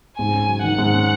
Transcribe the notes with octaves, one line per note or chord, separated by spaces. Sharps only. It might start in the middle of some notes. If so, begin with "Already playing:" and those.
G#2 G#5
C#4
F#3
D#3 F#5
G#2
C#4